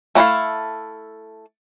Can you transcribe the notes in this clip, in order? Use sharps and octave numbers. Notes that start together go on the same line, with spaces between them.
A3 D4 E4 A4 F5